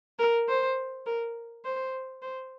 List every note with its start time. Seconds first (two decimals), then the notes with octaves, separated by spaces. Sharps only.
0.19 A#4
0.48 C5
1.06 A#4
1.65 C5
2.22 C5